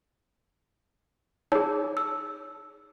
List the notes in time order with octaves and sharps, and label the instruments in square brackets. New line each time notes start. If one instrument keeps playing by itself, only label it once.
[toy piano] D#4 G#4 [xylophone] C#5 A5 E6
[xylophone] E6